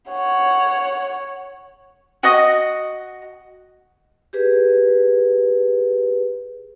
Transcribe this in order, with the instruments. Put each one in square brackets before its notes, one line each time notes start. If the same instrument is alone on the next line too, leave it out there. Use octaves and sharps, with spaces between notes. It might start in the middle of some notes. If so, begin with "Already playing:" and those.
[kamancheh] C#5 F#5
[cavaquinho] F#4 D#5 D#6
[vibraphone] G4 G#4 B4